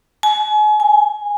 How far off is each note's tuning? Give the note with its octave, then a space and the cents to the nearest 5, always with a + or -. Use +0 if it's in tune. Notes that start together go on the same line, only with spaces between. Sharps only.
G#5 +35
G#5 -10